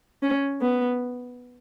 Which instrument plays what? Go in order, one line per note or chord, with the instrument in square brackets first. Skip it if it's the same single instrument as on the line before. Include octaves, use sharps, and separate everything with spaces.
[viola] C#4
B3